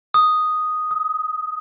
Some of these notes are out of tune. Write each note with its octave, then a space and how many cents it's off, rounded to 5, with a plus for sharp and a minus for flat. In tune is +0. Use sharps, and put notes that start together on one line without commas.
D#6 +0
D#6 +25